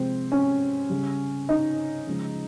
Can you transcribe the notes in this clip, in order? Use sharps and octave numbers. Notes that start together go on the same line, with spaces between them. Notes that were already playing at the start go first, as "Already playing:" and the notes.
Already playing: C3 F3 G#3 C4
C#4
C#3 G3
D#4
C#3 F3 G#3